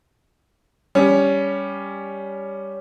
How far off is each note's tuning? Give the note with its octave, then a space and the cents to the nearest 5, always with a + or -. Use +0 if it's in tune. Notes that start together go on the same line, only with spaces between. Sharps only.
G3 +10 C#4 +15